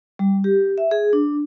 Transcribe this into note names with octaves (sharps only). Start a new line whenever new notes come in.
G3
G4
E5
G#4
D4